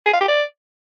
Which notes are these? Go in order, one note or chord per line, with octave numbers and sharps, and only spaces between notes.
G#4
F5
G4
D5